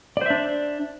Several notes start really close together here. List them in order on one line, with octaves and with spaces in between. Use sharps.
D5 C5 E5 D4